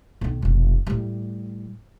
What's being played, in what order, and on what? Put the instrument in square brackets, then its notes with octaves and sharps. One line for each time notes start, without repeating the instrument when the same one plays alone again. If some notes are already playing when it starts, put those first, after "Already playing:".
[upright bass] B1 D#3
F1 B2
A2 G3